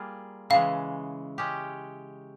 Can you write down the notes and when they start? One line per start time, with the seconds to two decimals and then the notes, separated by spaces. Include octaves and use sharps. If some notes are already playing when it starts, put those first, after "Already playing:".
Already playing: G3 A#3 F4 G#4
0.50 C#3 E3 G#3 F5
1.38 G#3 C#4 G4